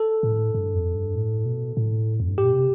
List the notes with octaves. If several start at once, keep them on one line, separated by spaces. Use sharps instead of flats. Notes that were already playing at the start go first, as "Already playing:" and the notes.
Already playing: A4
A2
G2
F2
G2
A2
B2
A2
F2
G2
A2 G4
B2
C3